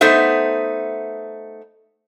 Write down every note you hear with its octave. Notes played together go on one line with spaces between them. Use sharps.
A3 B3 D#4 C5 E5